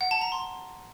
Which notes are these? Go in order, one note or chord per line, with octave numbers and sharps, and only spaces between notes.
F#5
A5
A#5
C6